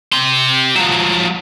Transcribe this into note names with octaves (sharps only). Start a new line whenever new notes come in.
G4 C6
F3 F#3